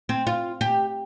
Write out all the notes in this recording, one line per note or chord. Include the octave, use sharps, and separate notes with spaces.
C4
F4
G4